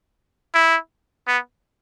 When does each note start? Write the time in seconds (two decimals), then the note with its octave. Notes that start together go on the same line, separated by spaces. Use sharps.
0.54 E4
1.27 B3